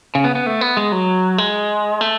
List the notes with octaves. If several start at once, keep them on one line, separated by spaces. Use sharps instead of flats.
C#3
B3
B3
A3
B3
G#3
F#3
G#3
A3